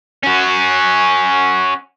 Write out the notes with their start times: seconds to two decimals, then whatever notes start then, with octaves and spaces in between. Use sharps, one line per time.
0.23 C#4 F#4